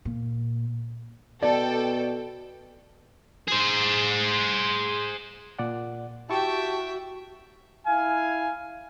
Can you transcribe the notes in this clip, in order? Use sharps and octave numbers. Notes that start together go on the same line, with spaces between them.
A#2
B2 A4 D5 G5
G#4 C5
A#2 D5 F#5
E4 F#4 G4 E5 G5 A5 C#6
E4 F5 G#5